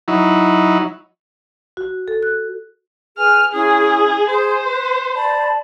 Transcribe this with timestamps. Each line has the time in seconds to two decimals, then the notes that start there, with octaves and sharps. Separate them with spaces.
0.08 F#3 D#4 E4
1.77 F#4
2.08 A4
2.23 F#6
3.18 G#4 B4 G#5 F6
3.53 C#4 E4 G#4 D#6
4.30 G#4 C5
4.64 B4
5.14 D5 A5 B5